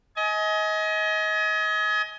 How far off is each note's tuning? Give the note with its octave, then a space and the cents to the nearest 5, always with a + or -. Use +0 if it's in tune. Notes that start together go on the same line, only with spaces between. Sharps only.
D#5 +30 G#5 +25